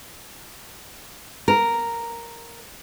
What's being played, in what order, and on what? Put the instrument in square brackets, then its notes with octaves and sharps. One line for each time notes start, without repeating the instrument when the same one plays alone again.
[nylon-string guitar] A#4